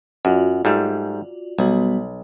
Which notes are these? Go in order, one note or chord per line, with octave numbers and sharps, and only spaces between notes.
F#2 F4 F#4 D5
G#2 G3 A3
B1 G3 B3 F#4